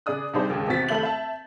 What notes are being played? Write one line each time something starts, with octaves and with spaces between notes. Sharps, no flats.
C#3 G#4 D5 D#6 F#6
C3 G3 D4 D#4 G#4 C5
A#1 D#2 C#3 G#3
E2 C3 C4 F#4 A6 B6
F1 A3 E5 G6 F#7
E5 A5